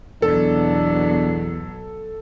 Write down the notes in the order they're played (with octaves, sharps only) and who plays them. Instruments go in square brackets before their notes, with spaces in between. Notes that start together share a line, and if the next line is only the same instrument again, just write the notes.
[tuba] E2 [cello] B2 F#3 [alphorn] D4 [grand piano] A4